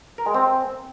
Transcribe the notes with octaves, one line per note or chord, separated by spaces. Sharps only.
A#4
G#3
C4